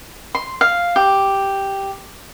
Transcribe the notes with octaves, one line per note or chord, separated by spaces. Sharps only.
C6
F5
G4